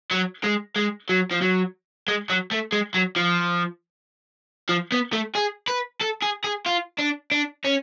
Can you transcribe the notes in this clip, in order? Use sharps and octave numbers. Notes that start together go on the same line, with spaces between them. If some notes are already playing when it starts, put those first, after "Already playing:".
F#3
G#3
G#3
F#3
F3
F#3
G#3
F#3
A3
G#3
F#3
F3
F3
B3
A3
G#4
B4
A4
G#4
G#4
F4
D4
D4
C#4